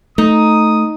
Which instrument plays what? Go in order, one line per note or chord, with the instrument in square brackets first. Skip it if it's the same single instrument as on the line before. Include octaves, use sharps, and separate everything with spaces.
[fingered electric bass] A3 [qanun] D#4 [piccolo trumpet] D#6